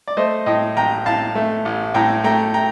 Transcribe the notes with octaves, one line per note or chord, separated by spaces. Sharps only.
D5
A3 C5 D#5
A2 D#5 G5
A1 G5 A#5
A2 F5 A5
A3
A1
A2 G5 A#5
A3 G5 A#5
G5 A#5